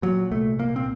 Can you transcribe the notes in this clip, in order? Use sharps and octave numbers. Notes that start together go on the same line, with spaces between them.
A#2 F#3
C2 A3
A#2 A#3
C4